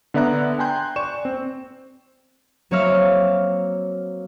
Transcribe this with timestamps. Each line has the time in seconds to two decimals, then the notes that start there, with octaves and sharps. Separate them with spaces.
0.14 D3 B3 D5 E5 A#5 F#6
0.59 G5 G#5 A#5 C6 F#6 G6
0.96 D5 C#6 E7
1.25 C4
2.71 F#3 A#3 C4 C#5 E5 F5